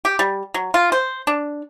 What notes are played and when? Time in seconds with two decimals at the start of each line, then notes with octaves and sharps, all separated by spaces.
0.05 G4
0.19 G3
0.54 F#3
0.74 F4
0.92 C5
1.27 D4